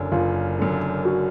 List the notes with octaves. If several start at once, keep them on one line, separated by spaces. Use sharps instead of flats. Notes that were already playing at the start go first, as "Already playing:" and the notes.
Already playing: F#1 F#2 D3
F#1 F4
F#2 D3
F#4